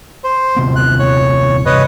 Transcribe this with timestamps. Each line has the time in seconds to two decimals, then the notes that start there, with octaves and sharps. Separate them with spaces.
0.24 C5
0.56 D#1 C3 B3
0.76 F#6
0.99 C#5
1.66 G2 C3 B4 C#5 D#5